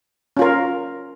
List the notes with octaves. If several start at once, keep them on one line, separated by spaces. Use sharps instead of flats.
C#4 F4 A#4